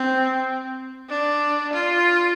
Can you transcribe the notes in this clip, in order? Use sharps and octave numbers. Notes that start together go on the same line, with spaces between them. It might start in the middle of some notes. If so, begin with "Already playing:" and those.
Already playing: C4
D4
F4